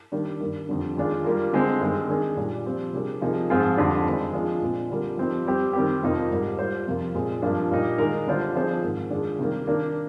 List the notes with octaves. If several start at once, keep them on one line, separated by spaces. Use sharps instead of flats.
D#3 G3 A#3 D4
G2 D#3 A#3
F2 D3 G3 D4
D#3 G#3 D4 F4 G#4
G3 A#3 F4 A#4
D3 G#3 C4
G2 D#3 G#3 C4
D#3 G#3 D4 G#4
A#2 G3 D4
F3 C4 G4
C3 G3 A#3 D4 G#4
C3 F3 A#3 D#4 G#4
G#2 F3 C4 F4 G#4
F2 D3 G3 D4
D#3 G#3 C4
F3 G#3 D4 F4
A#2 G#3 C4
D3 G3 A#3 F4 A#4
F3 C4 D#4 G4
G3 C4 G4
D#3 G3 C4 G4
F2 C3 F3 A#3 D#4
G#2 G3 A#3
G3 A#3 F4 C5
F2 C3 F3 A#3 F4
A#2 G#3 C4
G2 F3 A#3 D4
A#2 G3 A#3 D#4
D#3 G#3 D#4 A#4
D3 G3 D4 F4 C5
F3 C4 D#4 G#4 C5
G#2 D#3 A#3
D#3 G#3 D4 F4 G#4
C3 D#3 G3 A#3
D#3 A#3 D4